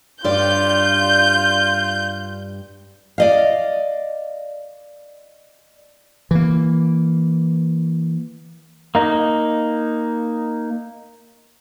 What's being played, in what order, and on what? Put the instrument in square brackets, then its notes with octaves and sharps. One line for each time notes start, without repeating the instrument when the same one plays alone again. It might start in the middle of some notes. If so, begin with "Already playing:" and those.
[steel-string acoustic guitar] G2 G3 D5 [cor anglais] F4 [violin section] G6
[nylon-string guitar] D5 D#5 F5
[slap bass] E3 A#3
[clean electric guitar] A#3 D#4